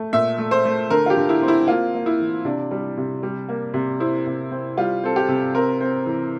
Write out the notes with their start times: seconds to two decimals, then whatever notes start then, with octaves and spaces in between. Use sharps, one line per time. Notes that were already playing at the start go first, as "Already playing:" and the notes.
Already playing: A3
0.13 A#2 E5
0.38 A3
0.51 C5
0.65 A3
0.90 D3 A#4
1.06 F4
1.10 G4
1.17 D3
1.29 E4
1.42 C4
1.48 E4
1.68 A#3 F4
1.94 A#3
2.06 E4
2.20 E3
2.45 C3 D4
2.71 G3
2.97 C3
3.23 G3
3.49 A#3
3.74 C3
4.00 C4 E4
4.26 C3
4.51 C4
4.77 G3 F4
5.03 C4 A4
5.16 G4
5.28 C3
5.54 C4 A#4
5.81 C4
6.06 E3